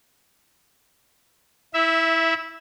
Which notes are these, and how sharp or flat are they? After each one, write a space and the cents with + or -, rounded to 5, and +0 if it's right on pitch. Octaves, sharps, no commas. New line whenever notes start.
E4 -15 E5 +0